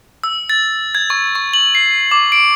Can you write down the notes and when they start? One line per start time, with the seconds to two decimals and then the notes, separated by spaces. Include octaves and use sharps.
0.24 E6
0.50 A6
0.95 G#6
1.10 C#6
1.35 C#6
1.54 F#7
1.75 C7
2.11 D6
2.32 D7